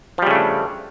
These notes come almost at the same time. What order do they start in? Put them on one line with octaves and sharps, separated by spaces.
F3 G3 C#3 A3 D4